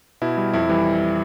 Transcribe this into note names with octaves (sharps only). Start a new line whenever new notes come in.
B2 E4
G3
F2 E4
E3 G3